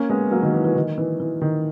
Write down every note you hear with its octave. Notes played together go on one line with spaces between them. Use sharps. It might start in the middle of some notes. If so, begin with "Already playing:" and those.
Already playing: A#3 C#4
G#3 B3
F#3 A#3
D#3 F#3
E3
E3
D#3
E3
E3
D#3